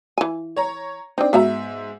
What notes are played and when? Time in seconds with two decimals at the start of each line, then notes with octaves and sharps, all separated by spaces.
0.18 E3 G#5
0.56 C#5 A#5
1.18 C4 D4 D#4
1.33 G#2 B3 F#4 E5 A#5